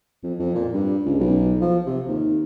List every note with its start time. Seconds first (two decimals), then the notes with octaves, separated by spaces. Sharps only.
0.24 F2
0.39 F2
0.55 A#2
0.73 G2
1.06 C#2
1.20 B1
1.61 F3
1.86 C3
2.08 D#2